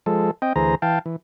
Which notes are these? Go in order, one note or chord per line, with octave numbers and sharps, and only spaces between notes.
F3 G#3 A4
C4 D#5 G5
D2 E3 G#4 C5 A#5
E3 F5 G5 A5
E3